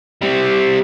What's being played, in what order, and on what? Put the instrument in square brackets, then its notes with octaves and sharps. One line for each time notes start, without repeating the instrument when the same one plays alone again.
[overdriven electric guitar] G3 C4